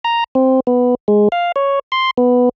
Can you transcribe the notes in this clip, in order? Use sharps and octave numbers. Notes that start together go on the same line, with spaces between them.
A#5
C4
B3
G#3
F5
C#5
C6
B3